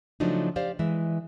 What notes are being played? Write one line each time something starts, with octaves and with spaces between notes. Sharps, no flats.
C#3 F3 F#3 A3 D4 D#4
G4 C5 D5 F5
E3 G#3 E5